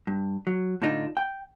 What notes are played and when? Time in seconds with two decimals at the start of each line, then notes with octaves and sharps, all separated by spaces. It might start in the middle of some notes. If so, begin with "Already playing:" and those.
0.07 G2
0.47 F#3
0.82 A2 D3 D4 D#4 F4
1.17 G5